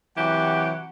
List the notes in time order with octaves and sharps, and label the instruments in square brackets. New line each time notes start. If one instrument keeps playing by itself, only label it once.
[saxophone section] C3 E3 F#3 [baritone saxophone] G4 [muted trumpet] F#5